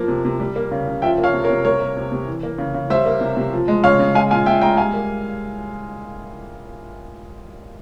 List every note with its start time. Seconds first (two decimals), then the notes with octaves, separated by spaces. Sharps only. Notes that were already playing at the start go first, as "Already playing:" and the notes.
Already playing: F3 A#3
0.08 C3
0.25 C3
0.40 G3
0.56 A#3
0.71 C#3
0.87 C#3
1.02 F3 E5 G5
1.18 A#3
1.23 C#5 F5
1.34 C3
1.44 A#4 C#5
1.50 C3
1.65 G3 A#4 C#5
1.80 A#3
1.97 C3
2.12 C3
2.27 E3
2.43 A#3
2.58 C#3
2.74 C#3
2.90 G3 C5 E5
3.06 A#3
3.21 C3
3.37 C3
3.53 F3
3.68 G#3
3.84 C#3 C#5 F5
3.99 C#3
4.15 G#3 F5 G#5
4.31 A#2 F5 G#5
4.46 A#2 E5 G5
4.61 G#3 G5 A#5
4.77 G3 F5 G#5
4.94 A#3